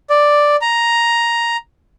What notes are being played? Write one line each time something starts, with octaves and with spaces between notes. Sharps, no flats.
D5
A#5